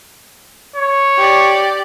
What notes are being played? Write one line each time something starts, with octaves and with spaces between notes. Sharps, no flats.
C#5
G4 D5